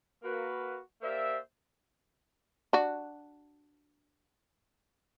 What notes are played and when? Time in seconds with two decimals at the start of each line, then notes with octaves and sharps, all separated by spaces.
0.24 A#3 F#4 B4
1.02 A#3 G4 C5 D5 E5
2.73 D4 F#4